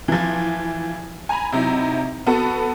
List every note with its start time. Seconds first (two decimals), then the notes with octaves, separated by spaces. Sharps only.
0.08 E3 F3
1.29 G#5 A#5 B5
1.52 C3 F#3 D#4 E4
2.27 B3 F#4 A4